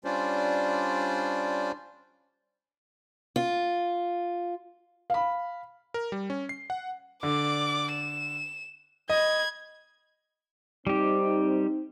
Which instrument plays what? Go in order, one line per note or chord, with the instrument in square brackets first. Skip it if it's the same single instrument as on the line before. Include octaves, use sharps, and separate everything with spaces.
[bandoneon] G3 C#4 D4 F4 C5 D5
[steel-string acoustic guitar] F4
[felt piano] F5 B5
[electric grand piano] A#4
G3
C#4
C7
F#5
[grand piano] D3 [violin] D5 D6
[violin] E7
[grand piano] D#5 [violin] B5 G#6
[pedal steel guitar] G3 G4 [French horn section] C4 D#4